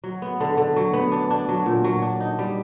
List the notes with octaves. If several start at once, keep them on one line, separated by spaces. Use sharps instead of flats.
F#3
B3
D3
D3
F#3
B3
D4
D4
F#3
A#2
F#3
D4
D#4
G3